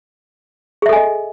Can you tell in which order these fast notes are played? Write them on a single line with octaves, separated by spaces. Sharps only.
G#4 E5 A4 G#5 D#5